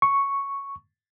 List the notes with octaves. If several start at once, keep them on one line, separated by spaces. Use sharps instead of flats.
C#6